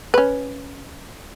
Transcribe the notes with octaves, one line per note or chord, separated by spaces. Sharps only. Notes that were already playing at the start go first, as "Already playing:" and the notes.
C#4 B4